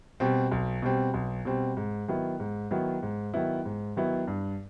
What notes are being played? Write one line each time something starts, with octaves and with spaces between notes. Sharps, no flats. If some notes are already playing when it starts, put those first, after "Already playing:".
B2 G3 C4
B1
B2 G3 C4
B1
B2 G3 C4
G#2
D#3 F#3 B3 E4
G#2
D#3 F#3 B3 E4
G#2
D#3 F#3 B3 E4
G#2
D#3 F#3 B3 E4
G2